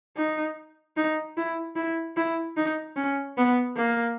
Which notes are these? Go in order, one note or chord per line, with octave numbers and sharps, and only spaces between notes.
D#4
D#4
E4
E4
E4
D#4
C#4
B3
A#3